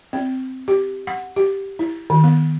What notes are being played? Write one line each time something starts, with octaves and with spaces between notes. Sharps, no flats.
C4
G4
F#5
G4
E4
D#3
B3